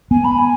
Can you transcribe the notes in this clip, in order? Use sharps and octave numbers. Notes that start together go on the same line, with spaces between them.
B3 G#5
B5
G#5